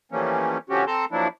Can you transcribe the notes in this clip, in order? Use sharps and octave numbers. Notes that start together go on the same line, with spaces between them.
E3 F3 G3 A3 A#3 C#4
D3 F3 C#4 F#4 G4
C4 A4 A5 A#5 C6
F3 F#3 A#3 D4 E4